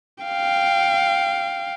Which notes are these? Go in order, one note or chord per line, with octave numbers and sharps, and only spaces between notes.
F5 G5